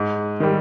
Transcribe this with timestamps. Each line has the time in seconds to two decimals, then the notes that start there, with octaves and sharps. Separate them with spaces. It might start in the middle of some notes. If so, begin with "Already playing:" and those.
Already playing: G#2
0.40 D#3 G3